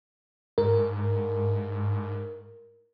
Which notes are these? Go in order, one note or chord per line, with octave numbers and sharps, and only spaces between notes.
G#2 A#4